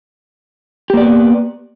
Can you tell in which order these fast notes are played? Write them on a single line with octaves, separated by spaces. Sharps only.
G4 A#3 D5 B3